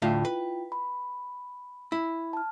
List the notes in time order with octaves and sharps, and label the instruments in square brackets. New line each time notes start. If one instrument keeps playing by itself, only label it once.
[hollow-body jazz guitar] D2 A2 F5 [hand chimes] E4 F4 G5
[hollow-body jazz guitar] B4
[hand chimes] B5
[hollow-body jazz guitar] E4 [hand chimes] B5
[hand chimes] A5 F6